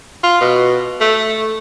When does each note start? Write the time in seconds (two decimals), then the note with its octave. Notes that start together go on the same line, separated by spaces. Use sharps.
0.23 F4
0.41 B2
1.00 A3